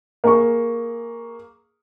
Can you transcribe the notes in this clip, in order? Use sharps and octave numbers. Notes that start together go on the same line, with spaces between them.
A#3 G#4 C#6